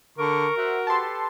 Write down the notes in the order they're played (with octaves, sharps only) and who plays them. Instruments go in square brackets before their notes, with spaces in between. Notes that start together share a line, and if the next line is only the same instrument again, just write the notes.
[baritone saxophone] D3 [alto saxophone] A#4 [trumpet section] C#6
[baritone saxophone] F#4 [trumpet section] C5 E5 F#5
[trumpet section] G4 A4 B4 [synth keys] A5 C6